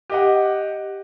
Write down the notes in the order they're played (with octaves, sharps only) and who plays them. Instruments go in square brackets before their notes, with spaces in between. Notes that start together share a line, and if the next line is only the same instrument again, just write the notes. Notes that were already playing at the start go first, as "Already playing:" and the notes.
[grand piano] G4 D#5 F#5